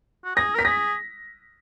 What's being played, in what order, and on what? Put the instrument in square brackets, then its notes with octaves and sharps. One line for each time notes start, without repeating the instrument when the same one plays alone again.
[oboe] F#4
[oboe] G#4 [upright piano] A#6
[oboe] A#4 [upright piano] B6
[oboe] G#4 [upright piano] A#6